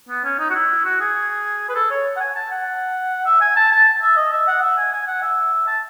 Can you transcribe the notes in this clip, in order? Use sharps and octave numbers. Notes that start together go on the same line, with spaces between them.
B3
C#4
D#4
F#4
E4
F#4
G#4
B4
A4
C#5
F#5
G#5
A5
F#5
E5
G#5
A5
A5
E5
D#5
E5
F#5
E5
G#5
G#5
F#5
E5
A5